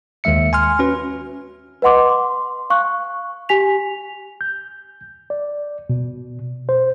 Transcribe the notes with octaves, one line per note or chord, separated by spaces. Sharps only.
D#2 D#3 G#3 E5 C#7
G#5 C6 F6
C#4 F#4 B4
B4 D#5 F#5 C6 D6
C6
F5 C#6 F#6
G4 G#5 B6 F7
G6
D5
B2
C5